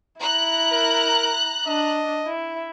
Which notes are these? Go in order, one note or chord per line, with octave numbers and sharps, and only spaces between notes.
E4 A#5 F#6
A#4
D4 D#5
E4